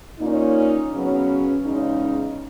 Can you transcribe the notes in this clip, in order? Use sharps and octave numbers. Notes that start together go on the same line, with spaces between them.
A#2 A#3 C#4 D#4
C#3 F#3 B3 C#4
E2 C#3 G#3 C#4 D#4